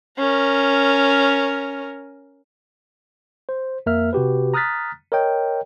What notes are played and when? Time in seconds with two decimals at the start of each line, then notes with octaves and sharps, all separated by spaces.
0.18 C#4 A#4
3.49 C5
3.86 F2 A#3 A#4 E5 F6
4.13 C3 F#4 G4 B4
4.54 A#5 D#6 F6 F#6 A6 B6
5.12 A#4 C#5 D#5 G5